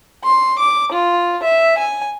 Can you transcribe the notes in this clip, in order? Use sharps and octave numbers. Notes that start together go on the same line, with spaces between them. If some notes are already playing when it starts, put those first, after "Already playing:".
C6
D6
F4
E5
G#5